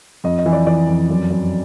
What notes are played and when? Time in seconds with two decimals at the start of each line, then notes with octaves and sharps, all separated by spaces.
0.24 F2 D#5
0.38 D#5
0.46 E3
0.53 D5
0.67 E3 D5
0.88 F2
1.10 F#2
1.30 F#2